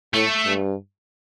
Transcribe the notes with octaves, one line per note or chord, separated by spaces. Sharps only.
A2 A3
G2